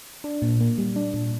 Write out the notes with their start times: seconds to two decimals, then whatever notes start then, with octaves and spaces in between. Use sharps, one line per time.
0.24 D4
0.42 A#2
0.60 A#3
0.78 G3
0.96 D4
1.14 A#2